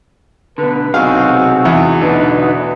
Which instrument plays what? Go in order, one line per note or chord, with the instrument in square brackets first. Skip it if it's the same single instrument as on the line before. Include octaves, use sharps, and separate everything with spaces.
[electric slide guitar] B2 D3 [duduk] B4
[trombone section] B1 F#4 [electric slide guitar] C3 D#4 G#4 [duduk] C4 [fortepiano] F5
[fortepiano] E2
[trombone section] B2 D3 [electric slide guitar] A3 D4 D#4 [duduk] B4